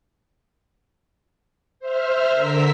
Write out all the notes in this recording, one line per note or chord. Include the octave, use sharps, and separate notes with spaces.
C5 E5 F6
D3 A#4 E6 B6